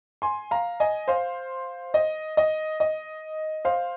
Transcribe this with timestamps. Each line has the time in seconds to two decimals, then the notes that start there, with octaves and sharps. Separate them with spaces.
0.22 G#5 C6
0.51 F5 A#5
0.80 D#5 G#5
1.08 C5 F5
1.94 D#5
2.37 D#5
2.80 D#5
3.65 C5 F5